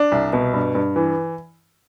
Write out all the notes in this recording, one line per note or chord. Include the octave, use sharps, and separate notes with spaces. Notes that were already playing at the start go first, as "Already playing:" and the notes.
Already playing: D4
C2
B2
G2
G2
E3